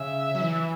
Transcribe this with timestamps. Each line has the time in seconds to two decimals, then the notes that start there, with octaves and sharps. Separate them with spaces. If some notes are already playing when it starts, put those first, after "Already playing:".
Already playing: C#3 E5
0.35 F#3
0.41 E3